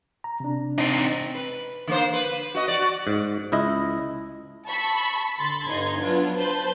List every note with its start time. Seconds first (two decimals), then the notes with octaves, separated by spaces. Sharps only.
0.24 A#5
0.40 C3 D4
0.78 C4 D#4
1.35 B4
1.88 D3 A#3 C5
2.13 B4
2.55 F#4 D#5
2.68 F#4 D5
3.07 G#2
3.52 C#2 E4 D#5
4.68 A5 B5 C#6 E6 B6
5.39 D3 B5 C6 A6
5.68 G1 G2 D#4 C6 G#6
6.01 F#3 B3 D4 F4
6.35 B4 C5 A5 G6